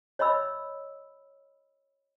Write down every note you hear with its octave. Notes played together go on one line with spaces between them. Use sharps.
C#5 D#5 E5 B5 E6